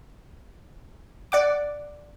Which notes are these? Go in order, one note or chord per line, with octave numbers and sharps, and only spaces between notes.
D5 F#5 D6